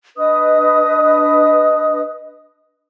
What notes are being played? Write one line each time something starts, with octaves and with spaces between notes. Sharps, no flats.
D4 B4 D#5 D#6